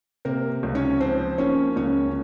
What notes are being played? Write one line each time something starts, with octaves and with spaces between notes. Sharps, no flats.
C3 A#3 A#4
C#2
C#4 C#5
F3 C4 C5
A#3 C#4 C#5
C#2 C#4 C#5